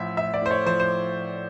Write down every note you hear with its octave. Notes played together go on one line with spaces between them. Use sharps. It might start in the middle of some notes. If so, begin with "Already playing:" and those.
Already playing: A1 F3 E5
A1 E5
D5
A2 C5
C#5
F3 C5
C5